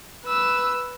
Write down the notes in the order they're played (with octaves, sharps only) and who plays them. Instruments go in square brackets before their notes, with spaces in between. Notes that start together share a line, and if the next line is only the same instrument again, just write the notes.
[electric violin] B4 E6